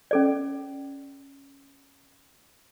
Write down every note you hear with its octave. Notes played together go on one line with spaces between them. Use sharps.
C#4 A4 D5